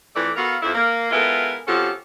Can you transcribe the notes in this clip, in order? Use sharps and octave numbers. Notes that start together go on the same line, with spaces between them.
F2 E3 A3 D5
B3 F#4 A4 A#4 F5
F2 E4
A#3
G#3 B3 E4 F4 A4 A#4
C3 F3 C#4 F#4 G4 A4